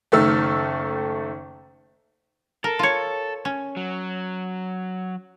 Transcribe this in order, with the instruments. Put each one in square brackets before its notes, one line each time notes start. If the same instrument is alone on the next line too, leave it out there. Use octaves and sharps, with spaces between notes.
[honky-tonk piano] F#1 D#3 A3 E6 F6
[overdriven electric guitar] A4 [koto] A#4
[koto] F4 C#5
C#4
[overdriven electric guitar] F#3